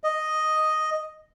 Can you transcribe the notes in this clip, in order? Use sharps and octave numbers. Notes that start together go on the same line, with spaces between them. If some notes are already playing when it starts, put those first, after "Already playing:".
D#5